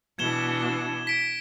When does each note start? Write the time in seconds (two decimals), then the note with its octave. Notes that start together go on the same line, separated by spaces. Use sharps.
0.19 B2 E3 D4 G#6 E7 G7
1.07 B6 D7